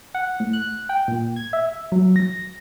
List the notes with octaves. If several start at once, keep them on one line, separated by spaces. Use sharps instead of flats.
F#5
A2
F#6
G5
A#2
G#6
E5
F#3
A#6